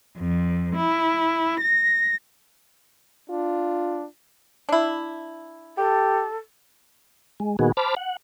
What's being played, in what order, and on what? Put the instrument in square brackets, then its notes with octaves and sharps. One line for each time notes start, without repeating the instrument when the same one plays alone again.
[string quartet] F2
E4
A#6
[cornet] D4 [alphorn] F4
[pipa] D4 E4
[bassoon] G4 [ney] A4
[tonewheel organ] G#3
A#2 D#3 B3 F#4 G#4
C5 A5 B5 D6 F6
F#5